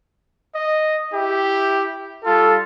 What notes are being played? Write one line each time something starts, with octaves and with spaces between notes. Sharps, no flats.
D#5
E4 G4
G3 F4 A4